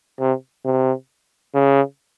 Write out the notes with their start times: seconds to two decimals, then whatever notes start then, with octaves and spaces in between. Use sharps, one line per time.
0.19 C3
0.65 C3
1.54 C#3